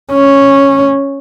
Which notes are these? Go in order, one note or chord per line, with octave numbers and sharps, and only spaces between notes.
C#4